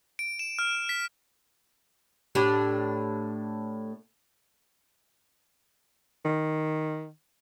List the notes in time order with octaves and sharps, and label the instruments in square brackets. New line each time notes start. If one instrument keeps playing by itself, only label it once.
[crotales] D7
E7
F6
B6
[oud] A2 D4 G4
[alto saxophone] D#3